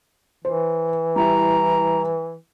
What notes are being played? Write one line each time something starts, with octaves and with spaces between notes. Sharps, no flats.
E3 C5
G3 E4 A#5